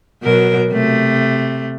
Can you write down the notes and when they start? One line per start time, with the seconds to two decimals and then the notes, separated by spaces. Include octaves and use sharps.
0.22 B2 F#3 A#4
0.70 C3 A3